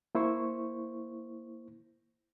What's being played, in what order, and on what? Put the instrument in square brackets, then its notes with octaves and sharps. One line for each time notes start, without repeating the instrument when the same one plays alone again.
[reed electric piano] A#3 E4 C5 C#6